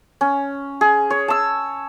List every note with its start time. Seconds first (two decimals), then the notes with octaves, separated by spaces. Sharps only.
0.21 C#4
0.81 G#4
1.10 C#5
1.28 A5 E6